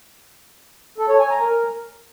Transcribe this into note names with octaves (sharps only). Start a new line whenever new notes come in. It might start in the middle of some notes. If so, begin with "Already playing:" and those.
A4
C#5
G#5
A#5
A#4